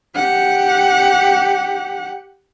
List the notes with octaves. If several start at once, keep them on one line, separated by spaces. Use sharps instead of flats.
G4 F#5